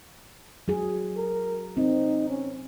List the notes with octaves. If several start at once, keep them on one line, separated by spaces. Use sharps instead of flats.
F#3 G#4
A#4
C4 D#4
C#4